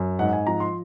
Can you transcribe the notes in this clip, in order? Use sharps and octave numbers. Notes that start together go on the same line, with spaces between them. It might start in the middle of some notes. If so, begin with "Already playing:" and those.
Already playing: F#2
G#2 F#5
G#5
F3 A#5
C6